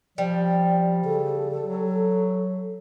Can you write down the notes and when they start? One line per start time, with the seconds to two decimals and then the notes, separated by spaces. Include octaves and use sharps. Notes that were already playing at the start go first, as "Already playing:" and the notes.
0.18 F3 G3 D5
1.05 C#3 A4
1.63 F#3